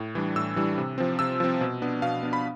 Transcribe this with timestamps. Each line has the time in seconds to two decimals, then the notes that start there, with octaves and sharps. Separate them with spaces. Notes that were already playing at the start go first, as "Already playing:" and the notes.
Already playing: A2
0.15 E3 G3 D4
0.36 A2 E6
0.56 E3 G3 D4
0.78 C3
0.98 F3 C4
1.19 C3 E6
1.40 F3 C4
1.61 B2
1.82 B3 D4
2.02 B2 F5
2.23 B3 D4
2.33 B5